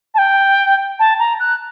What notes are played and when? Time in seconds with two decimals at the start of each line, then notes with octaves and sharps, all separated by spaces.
0.14 A5
0.18 G5
0.99 A5
1.19 A#5
1.39 F#6